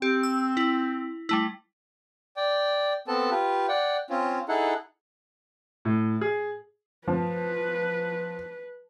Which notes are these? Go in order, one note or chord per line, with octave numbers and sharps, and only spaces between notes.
C4 G4
E6
E4
G3 A3 E4
D5 G5
B3 C4 A4 A5
F4 G4 B4
D5 F#5 G5
C4 C#4 F4
D#4 E4 G#4 A4 F#5
A2
G#4
F3 B4